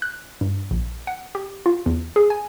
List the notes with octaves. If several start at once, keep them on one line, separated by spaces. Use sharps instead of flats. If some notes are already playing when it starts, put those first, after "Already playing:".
F#6
G2
A#1
F#5
G4
F4
E2
G#4
G#5